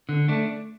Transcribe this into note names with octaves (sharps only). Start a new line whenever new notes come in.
D3
A3 D4